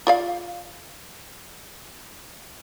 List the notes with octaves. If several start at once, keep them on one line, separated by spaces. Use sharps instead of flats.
F4 D5 F5